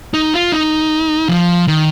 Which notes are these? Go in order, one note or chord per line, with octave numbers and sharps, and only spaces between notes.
D#4
F4
D#4
F3
D#3